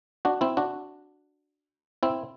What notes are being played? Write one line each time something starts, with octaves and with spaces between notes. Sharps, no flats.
D4 F#4
C4 E4
D4 F#4
C4 E4